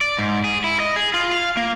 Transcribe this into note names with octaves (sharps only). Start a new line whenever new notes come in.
D5
G#2
G#4
E4
D#5
G#4
F4
F5
A#3